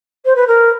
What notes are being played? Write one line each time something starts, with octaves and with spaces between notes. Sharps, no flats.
C5
B4
A#4